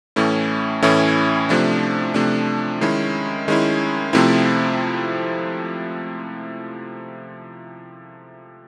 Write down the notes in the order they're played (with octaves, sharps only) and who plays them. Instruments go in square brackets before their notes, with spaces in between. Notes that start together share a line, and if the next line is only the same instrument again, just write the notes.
[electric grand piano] A2 E3 A3 C#4 E4
A2 E3 A3 C#4 E4
C3 F3 A3 D4
C3 F3 A3 D4
D#3 G#3 C#4 E4
D#3 G#3 C#4 E4
C3 F3 A3 C4 E4